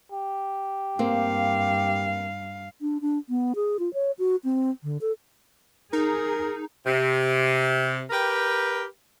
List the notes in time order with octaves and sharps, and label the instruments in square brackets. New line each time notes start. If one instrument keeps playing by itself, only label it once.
[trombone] G4
[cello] G2 F5 [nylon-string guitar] A#3 C4
[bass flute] D4
D4
B3
G#4
F4
C#5
F#4
C4
D3
A4
[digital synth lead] D#4 [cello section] G#4 [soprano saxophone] A#4
[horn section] C3
G4 A#4 B4 G5